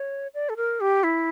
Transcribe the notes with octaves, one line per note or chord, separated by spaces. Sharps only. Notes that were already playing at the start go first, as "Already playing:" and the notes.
Already playing: C#5
D5
A4
A#4
G4
E4